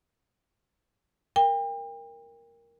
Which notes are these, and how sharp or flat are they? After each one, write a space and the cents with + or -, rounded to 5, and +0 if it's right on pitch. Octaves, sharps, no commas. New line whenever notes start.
A#4 +0 G5 +35